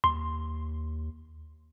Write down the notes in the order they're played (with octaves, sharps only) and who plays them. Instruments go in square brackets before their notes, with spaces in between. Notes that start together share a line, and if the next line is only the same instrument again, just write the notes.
[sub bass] D#2 [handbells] C6